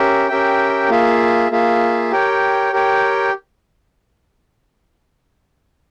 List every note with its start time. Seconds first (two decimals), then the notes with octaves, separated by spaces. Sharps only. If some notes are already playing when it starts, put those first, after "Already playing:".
Already playing: C#4 G4 A#4 E5
0.28 C#4 G4 A#4 E5 G5
0.90 A#3 F4 G#4 E5
1.50 A#3 F4 G#4 E5
2.11 G4 A#4 C#5 G5
2.73 G4 A#4 C#5 G5